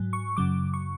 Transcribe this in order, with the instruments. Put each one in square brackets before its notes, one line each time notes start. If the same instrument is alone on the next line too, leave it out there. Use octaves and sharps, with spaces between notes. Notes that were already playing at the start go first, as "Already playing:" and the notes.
Already playing: [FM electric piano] G#2 F#3
C#6
F#2 C#3 F#3 D6
C#6